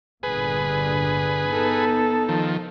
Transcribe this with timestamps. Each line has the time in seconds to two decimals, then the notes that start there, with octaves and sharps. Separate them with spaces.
0.23 G1 A#2 D3 G#4 B4
1.50 B3 D#4 A4
2.29 D#3 F3